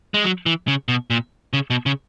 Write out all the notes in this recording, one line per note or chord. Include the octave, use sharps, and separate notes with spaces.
G#3
F#3
E3
C#3
B2
A#2
C#3
B2
C#3